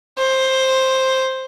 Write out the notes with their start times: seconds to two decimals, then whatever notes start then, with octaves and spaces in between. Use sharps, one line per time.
0.18 C5